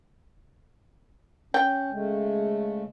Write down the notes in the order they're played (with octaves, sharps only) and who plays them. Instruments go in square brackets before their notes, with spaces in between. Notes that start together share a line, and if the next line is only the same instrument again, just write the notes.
[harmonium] C#4 [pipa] G5
[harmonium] C#3 G#3 A3